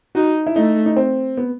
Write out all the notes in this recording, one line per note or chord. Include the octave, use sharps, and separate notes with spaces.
D#4 F#4
E4
A3 D#4
D#4
C4
B3